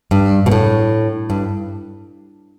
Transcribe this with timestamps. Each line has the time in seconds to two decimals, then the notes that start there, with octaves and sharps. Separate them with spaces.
0.11 G2
0.46 B2
0.51 A2
1.30 G2